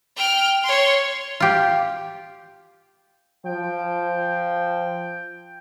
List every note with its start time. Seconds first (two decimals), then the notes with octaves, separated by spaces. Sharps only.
0.16 G5 F6
0.64 C#5 C6
1.40 F4 G4
3.46 F3 G5